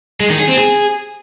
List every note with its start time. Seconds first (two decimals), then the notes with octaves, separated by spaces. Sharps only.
0.20 G#3
0.30 D#3
0.39 G#4
0.49 C4
0.58 G#4